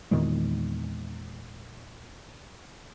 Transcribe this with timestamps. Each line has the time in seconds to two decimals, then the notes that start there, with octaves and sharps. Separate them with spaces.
0.11 E2 A#2 D#3 G#3